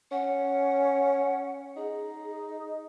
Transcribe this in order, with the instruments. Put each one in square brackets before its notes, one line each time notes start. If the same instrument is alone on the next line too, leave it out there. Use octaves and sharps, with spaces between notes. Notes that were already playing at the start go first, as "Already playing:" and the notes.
[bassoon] C#4 [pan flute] F#5
[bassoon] D#4 [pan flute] G#4